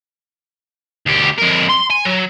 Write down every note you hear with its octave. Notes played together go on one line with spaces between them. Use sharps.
D2 G4
F2 A#4
C6
G#5
F#3